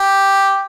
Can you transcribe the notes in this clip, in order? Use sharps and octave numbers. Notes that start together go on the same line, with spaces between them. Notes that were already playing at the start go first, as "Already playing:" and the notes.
Already playing: G4